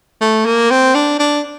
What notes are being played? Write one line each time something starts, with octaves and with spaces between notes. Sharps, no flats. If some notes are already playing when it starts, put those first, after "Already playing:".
A3
A#3
C4
D4
D4